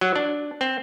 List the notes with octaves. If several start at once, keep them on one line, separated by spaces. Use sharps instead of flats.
F#3
D4
C4